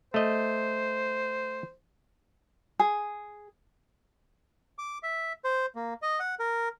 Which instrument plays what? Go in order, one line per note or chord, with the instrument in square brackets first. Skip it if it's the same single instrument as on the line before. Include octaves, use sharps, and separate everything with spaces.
[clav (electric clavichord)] A3 D#5 [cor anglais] C5
[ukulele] G#4
[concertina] D6
E5
C5
A#3
D#5
F#5
A#4